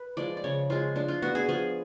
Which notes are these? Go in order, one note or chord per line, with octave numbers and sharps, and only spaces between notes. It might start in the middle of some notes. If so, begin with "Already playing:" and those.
Already playing: B4
F3 G#3 D5
D5
C#3 C#5
F3 G#3 F4
F3 D4
F4
B3 F#4
G#4
F3 G#4